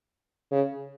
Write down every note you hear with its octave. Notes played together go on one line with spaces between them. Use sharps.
C#3